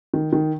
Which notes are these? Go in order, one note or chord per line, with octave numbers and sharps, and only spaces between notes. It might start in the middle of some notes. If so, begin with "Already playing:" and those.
D#3
D#3